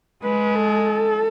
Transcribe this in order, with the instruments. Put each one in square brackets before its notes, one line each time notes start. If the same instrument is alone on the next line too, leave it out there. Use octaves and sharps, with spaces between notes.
[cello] G#3 [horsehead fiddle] B4
[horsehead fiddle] A4